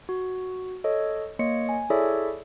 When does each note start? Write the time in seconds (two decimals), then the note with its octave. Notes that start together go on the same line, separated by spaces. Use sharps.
0.09 F#4
0.84 A4 C#5 D#5
1.39 A#3 C#5 D#5 C#7
1.69 G#5
1.90 E4 G#4 A4 C#5 D5 E5